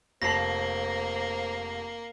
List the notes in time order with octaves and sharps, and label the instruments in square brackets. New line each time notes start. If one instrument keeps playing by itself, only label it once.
[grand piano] F1 A5 [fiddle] A#3 [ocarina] C5 [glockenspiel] A#6 C7